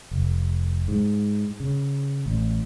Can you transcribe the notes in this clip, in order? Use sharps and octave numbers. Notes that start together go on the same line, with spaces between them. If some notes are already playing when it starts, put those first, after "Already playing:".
F1
G#2
C#3
A1